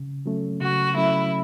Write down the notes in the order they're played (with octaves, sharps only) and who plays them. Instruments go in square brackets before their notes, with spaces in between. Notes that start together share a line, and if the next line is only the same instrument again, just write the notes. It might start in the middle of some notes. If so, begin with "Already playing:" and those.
Already playing: [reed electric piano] C#3
F#3 A3 C#4
[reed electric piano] C#3 [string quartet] F#4
[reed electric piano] F#3 A3 C#4 [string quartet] E4